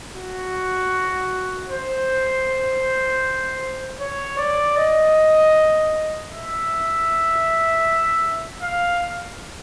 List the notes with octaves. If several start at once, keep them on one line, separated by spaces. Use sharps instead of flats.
F#4
C5
C#5
D5
D#5
E5
F5